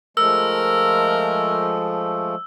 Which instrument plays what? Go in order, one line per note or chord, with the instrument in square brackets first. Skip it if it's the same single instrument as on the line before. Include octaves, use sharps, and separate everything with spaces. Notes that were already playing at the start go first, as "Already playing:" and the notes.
[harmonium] F3 G#3 A3 [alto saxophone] A#4 [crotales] E6